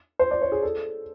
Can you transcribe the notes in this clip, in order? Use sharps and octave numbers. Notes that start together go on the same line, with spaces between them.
C5
D5
C#5
G#4
A4